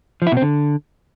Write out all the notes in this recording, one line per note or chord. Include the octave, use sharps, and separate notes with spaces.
F3
E4
B2
C4
D3